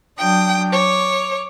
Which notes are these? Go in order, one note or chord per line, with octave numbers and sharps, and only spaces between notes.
F#3 D4 G5 D#6
C#5 D6